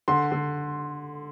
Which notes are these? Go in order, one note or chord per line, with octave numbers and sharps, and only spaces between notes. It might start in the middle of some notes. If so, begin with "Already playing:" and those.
D3 C6
D3